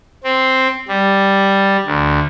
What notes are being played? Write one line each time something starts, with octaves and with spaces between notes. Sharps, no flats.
C4
G3
D2